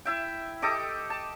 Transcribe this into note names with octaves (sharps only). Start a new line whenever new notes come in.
E4 E5 G5
G4 A4 D#5 D6
A5